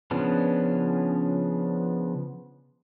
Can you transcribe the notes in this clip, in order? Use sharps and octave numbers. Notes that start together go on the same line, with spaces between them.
C#3 F3 B3 C#4 D4